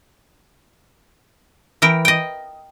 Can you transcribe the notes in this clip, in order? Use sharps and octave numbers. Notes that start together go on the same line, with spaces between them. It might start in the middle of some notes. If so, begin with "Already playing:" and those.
E3 A#4 G5
D#5 G5